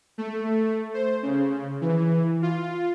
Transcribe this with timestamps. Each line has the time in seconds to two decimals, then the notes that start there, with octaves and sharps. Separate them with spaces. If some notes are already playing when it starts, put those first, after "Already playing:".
0.18 A3
0.94 C5
1.23 C#3
1.81 E3
2.42 F4